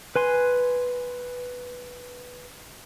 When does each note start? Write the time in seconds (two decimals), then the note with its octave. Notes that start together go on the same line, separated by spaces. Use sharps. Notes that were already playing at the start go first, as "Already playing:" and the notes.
0.16 B4 G#5 C6